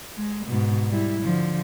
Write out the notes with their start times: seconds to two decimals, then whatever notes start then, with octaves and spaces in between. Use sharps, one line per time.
0.17 G#3
0.47 G#2 B2
0.89 G3 E4
1.22 D3 F3